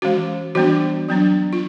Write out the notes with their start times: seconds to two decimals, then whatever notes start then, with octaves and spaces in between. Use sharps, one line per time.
0.02 E3 G#3 C#4 F#4
0.55 E3 G3 B3 D4 F#4
1.09 F#3 B3 D4
1.53 F4